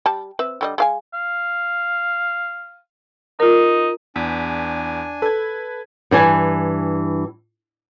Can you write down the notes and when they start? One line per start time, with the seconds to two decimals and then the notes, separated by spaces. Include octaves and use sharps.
0.06 G3 A5
0.39 C4 B4 E5
0.61 D3 G3 D#5
0.78 G#3 F5 G#5
1.14 F5
3.40 D#4 F4 A#4
4.16 E2 D4 G#5 B6
5.22 A4 B4 G#6
6.11 G2 E3 G#5